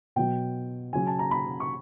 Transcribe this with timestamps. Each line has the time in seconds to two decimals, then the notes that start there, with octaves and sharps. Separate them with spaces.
0.16 B2 F#3 G5
0.93 C#3 F#3 G#5
1.07 A5
1.19 A#5
1.31 B5
1.60 C#6